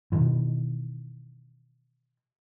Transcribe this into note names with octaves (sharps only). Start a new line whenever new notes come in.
B2 D#3 E3